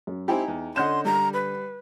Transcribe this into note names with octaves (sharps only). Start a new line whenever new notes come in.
F#2
C4 D#4 E4 G4 G5 G#5
E2
D3 C#4 D#5 F#5 C6 G6 E7
G3 A#5
B4